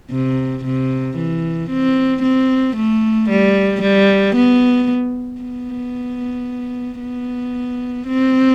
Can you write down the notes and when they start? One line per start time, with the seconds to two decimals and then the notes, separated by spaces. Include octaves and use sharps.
0.10 C3
0.64 C3
1.17 E3
1.70 C4
2.22 C4
2.76 A3
3.29 G3
3.82 G3
4.35 B3
5.41 B3
7.00 B3
8.07 C4